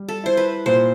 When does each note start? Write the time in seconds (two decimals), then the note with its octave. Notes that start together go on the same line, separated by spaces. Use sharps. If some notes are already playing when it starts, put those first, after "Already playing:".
Already playing: G3
0.09 A4
0.24 E4 C5
0.37 B4
0.66 A#2 C5